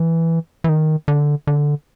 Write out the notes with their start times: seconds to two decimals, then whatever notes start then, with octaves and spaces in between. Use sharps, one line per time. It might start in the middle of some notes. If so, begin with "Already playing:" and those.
Already playing: E3
0.64 E3
0.69 D#3
1.08 D3
1.47 D3